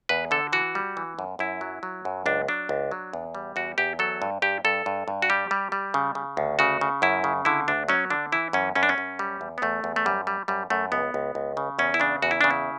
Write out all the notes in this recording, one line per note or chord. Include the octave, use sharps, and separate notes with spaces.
E2 B4
D3 A4
E3 F#4
G3
E3
F#2
F#2 E4
F#3
F#3
F#2
C#2 D4
F#3 D4
C#2
F#3
E2
G3
E2 F#4
E2 G4
F#3 A4
G2
G2 G4
G2 A4
G2
G2
F#4
G3 G4
G3
G3
C#3
C#3
D2
C#3 F#4
C#3
F#2 E4
C#3
D3 E4
D2 D4
F#3 C#4
D3 D4
E3 E4
F#2 C#4
F#2 C#4
D4
C#4
F#2
G3
E2
B3
E2 A3
E2
A3
F#2 G3
G3
F#2 G3
F#2 A3
C#2 B3
C#2
C#2
C#3
E2 C#4
E4
C#3 D4
E2 F#4
E4
C#3 D4
E4